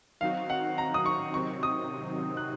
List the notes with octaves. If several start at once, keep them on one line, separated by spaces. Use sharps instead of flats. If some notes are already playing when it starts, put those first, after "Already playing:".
D#3 F#3 C4 D#4 F#4 F5
F#5
A#5
D#6
C#6
C3 D#3 F#3 C4 D#4 C#6
D#6
F#6